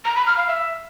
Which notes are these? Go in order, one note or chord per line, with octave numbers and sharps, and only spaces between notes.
A#5
B5
F6
F5
E5